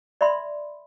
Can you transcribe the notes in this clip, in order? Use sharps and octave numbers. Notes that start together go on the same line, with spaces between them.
D5 E5 B5 C6